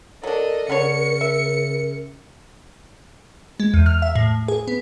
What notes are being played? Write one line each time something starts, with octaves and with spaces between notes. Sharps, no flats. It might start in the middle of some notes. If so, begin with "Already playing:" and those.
F#3 D4 A4 A#4 D#5
C#3 B3 D4 C#5 C#7
E5
G#3
E2
F6
E5
A2
G#4
B3